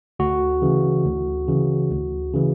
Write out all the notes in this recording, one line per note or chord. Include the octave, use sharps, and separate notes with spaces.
D2 F#4
C#3 E3
D2
C#3 E3
D2
C#3 E3